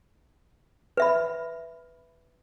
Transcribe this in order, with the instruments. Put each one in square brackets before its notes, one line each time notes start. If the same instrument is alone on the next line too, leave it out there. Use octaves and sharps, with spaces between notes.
[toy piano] B4 E5 B5